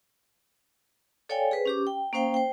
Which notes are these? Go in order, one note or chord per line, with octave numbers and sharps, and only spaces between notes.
A4 C#5 D5 F5 G5 G#5
G#4 B4 C5
C#4 G4 D6
G5
A#3 C#4 C5 F5 G5
C5 G5